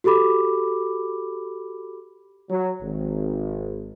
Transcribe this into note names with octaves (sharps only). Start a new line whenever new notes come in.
F#4 G4 A4 B5 D6
F#3
G#1